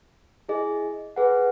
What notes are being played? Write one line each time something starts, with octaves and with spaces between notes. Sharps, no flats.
E4 G#4 D#5
G#4 B4 F#5